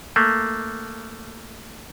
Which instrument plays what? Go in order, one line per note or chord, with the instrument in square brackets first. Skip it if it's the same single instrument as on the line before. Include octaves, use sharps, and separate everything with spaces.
[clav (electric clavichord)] A3 A#3